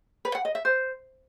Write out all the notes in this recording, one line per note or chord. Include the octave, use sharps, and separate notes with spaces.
B4
F#5
D#5
E5
C5